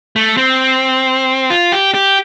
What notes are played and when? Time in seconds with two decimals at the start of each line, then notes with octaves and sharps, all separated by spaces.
0.16 A3
0.37 C4
1.50 F4
1.72 G4
1.94 G4